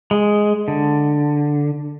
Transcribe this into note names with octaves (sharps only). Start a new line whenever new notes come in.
G#3
D3